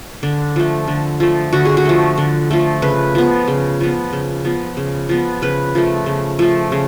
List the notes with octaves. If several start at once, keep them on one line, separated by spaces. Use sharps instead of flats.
D3 D4
F3 A3
D3
F3 A3
D3 F#4
G#4
F#4
F3 A3
D3
F3 A3
C#3 B4
F3 B3
C#3
F3 B3
C#3
F3 B3
C#3
F3 B3
C#3 B4
F3 A3
C#3
F3 A3
C#3